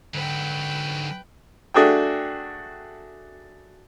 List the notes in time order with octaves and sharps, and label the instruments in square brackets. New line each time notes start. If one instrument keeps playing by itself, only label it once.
[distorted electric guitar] G#2 F#3 [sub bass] D3 [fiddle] B4 G5
[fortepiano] A3 D4 F#4 G#4 A4 G5